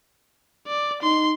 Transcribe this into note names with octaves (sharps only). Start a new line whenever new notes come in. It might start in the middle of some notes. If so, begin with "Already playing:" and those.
D5
D#4 C6